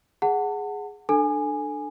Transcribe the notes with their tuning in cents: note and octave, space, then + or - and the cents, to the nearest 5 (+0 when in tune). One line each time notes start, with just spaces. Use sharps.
G#4 +0 F#5 +0 A5 +35
D4 +25 A4 +0 G#5 +0